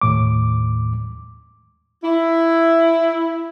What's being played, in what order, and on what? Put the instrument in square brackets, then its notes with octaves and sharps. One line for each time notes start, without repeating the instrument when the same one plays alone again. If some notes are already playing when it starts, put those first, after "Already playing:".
[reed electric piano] D#2 A2 D6
[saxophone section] E4